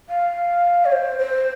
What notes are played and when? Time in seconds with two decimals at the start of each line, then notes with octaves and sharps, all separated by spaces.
0.09 F5
0.85 C#5
0.92 C5
1.19 C5